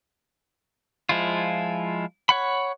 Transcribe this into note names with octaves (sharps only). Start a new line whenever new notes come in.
F3 G#3 E4 F4
C#5 F#5 B5